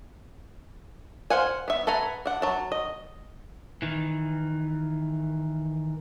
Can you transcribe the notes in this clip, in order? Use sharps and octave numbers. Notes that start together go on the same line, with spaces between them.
C5 F5 F#5 G#5
B3 E5
A4 B4 F#5 G#5 A#5
D4 F#5
F#3 A5
D#5
D#3 E3